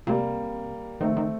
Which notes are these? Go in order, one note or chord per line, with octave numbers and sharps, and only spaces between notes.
C3 G3 A#3
D#3 A3 C4
D#3